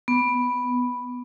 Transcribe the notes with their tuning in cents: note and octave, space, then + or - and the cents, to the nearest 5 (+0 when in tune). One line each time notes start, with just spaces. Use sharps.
B3 +0